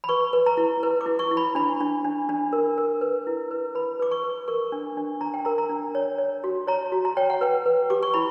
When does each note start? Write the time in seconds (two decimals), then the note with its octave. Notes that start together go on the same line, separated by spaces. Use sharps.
0.04 B5
0.09 B4 C#6
0.33 B4
0.46 A#5
0.57 E4
0.83 B4
1.01 D6
1.06 E4
1.19 C#6
1.31 E4
1.37 B5
1.55 D4 B5
1.80 D4
2.04 D4
2.29 D4
2.53 A#4
2.78 A#4
3.01 B4
3.27 E4
3.51 B4
3.75 B4 B5
4.00 B4 D6
4.11 C#6
4.24 B4
4.48 A#4 C#6
4.72 D4
4.97 D4
5.21 D4 A#5
5.34 G5
5.45 A#4 A#5
5.58 A#5
5.70 D4
5.95 C#5
6.18 C#5
6.44 F#4
6.67 C#5 A#5
6.92 F#4
7.05 A#5
7.17 C#5 G5
7.30 F#5
7.41 B4 G5
7.66 B4
7.90 G4 D6
8.03 C#6
8.14 E4 B5